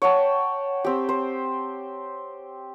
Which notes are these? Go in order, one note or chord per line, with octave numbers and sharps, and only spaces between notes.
C#5 F#5 G5 A5
C4 G4
C5